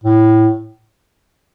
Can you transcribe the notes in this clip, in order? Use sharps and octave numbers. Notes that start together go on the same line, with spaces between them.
A2